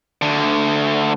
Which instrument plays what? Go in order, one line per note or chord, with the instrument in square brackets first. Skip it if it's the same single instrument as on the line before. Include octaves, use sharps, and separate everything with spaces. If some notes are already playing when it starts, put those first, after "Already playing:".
[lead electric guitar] D2 D3